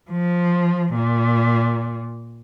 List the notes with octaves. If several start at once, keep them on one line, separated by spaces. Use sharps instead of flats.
F3
A#2